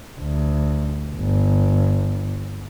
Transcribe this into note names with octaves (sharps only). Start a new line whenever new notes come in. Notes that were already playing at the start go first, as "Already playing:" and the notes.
D2
G1